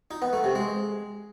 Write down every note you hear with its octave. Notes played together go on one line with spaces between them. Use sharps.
D#4
B3
A3
C3
G#3